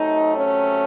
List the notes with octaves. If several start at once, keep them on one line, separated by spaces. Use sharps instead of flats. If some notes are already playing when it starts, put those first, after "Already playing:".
Already playing: C3 F#3 A3 D#4
C#4